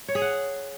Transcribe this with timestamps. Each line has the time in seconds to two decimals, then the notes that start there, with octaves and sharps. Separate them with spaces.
0.08 C#5
0.15 G#4
0.22 F#5